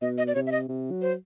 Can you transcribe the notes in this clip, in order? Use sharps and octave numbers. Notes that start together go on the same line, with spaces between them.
B2 D#5
D#5
D5
C3 C#5
E5
D#5
C3
F#3
C5